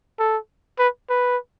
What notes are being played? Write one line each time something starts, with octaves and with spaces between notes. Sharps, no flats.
A4
B4
B4